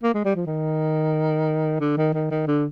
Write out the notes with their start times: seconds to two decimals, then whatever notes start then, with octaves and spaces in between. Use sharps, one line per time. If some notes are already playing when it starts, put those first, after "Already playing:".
0.03 A#3
0.14 G#3
0.25 G3
0.35 F3
0.46 D#3
1.80 D3
1.97 D#3
2.14 D#3
2.31 D#3
2.47 D3